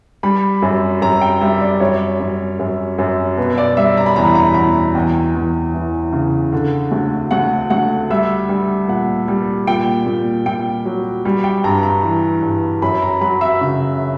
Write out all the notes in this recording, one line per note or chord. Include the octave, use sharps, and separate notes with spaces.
G3 B5
F#2
F#2 A#5
G5
G3 E5
D5
F#2 C#5
F#2
F#2
F#2
B2 B4
D5
G3 E5
A#5
B5
E2 A#5
B5
A#5
B5
E2 A#5
E2 G5
E2
E3
C#3
D3
D2
D2 F#5
D2 F#5
G3 E5
G3
A#2 F#5
G3
A#2 G5
A#2
A#2 G5
F#3
G3
G5
G2 A#5
A#5
E3
G2
F#2 B5
A#5
F#3 B5
E5
C#3